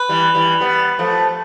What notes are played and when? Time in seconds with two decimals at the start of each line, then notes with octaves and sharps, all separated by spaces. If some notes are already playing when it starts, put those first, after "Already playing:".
Already playing: B4
0.09 E3 G3
0.35 E3 G3
0.60 G3 B3
0.99 F3 A3